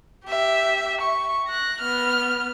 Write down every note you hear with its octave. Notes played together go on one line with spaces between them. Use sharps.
G4 E5
C#6
F#6 A#6
B3 F6